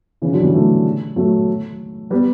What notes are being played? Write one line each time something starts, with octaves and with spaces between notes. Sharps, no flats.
C#3 E3
D3 F#3
E3 G3
F#3 A3
F#3 A3
G3 B3